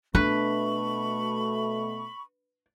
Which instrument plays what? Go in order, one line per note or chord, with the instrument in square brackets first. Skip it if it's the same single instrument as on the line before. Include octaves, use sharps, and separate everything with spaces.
[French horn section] B2 A3 [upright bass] D4 [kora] B4 [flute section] B5 C#6